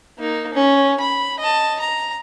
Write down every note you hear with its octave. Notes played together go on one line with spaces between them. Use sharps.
A#3 D#4
C#4
B5
D#5 A5
A#5